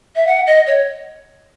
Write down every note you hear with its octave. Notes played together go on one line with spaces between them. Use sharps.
E5
F#5
D#5
C#5